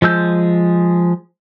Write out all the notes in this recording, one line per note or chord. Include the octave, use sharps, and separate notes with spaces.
F3 G#3 E6 G6